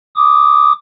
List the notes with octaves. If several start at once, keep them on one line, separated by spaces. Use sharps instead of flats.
D6 D#6